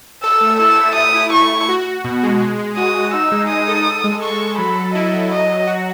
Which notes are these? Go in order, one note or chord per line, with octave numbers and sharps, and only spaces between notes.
A4 E6
A3
E4 E6
A3
A3 D#6
E4
E4 C#6
A3
F#4
F#4
B2
G#3
G#3
G#3
F#4 D#6
G#3
D#4 E6
G#3
G#3 D#6
A4
A4
G#3
A4 C#6
A4
F#3 B5
F#3
E4 D#5
F#3
F#3 D#5
F#3
F#4